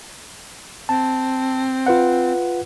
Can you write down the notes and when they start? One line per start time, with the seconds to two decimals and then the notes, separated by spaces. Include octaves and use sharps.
0.89 C4 A5
1.86 F4 B4 F#5